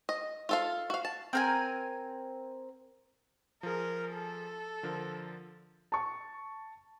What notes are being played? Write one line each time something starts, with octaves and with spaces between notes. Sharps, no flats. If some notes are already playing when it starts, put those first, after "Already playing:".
D#5
F4 A4 F5
F#4 F5
A5
C4 A#4 G#5
F3 G#4 A#4
A4
D3 F3 A#4
A5 C#6